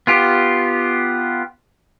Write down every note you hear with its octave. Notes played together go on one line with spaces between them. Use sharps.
B3 F4 G4